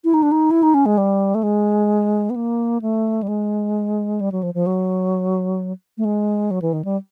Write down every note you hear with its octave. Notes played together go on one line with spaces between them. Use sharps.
E4
D#4
D4
D#4
E4
D#4
C#4
G#3
G3
A3
G#3
B3
A#3
A3
G3
G#3
G3
F#3
F3
F3
F#3
A3
G#3
F#3
E3
D#3
G3